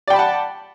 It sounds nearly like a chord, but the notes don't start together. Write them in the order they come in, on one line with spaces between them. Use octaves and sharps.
D5 G5 B5 A5 F#5